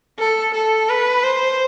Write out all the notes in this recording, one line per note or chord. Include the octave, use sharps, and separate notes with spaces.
A4
A4
B4
C5